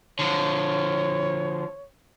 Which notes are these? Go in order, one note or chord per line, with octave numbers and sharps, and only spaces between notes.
D3 F3 C#5